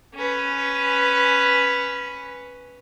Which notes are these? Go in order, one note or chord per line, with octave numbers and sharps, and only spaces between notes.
C#4 B4